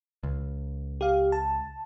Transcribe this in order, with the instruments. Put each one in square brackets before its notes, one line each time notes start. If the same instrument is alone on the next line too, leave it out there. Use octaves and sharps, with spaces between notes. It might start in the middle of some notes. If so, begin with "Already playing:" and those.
[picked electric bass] C#2
[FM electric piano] G4 F5
A5